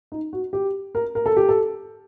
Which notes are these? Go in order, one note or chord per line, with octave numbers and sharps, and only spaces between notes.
D#4
F#4
G4
A#4
A#4
A4
G4
A4